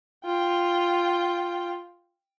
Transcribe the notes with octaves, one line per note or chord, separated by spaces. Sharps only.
F4 G5